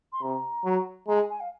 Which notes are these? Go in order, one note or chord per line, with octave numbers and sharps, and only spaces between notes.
C6
C3 A#5
F#3
G#3 A#5
G#5
G#5
F5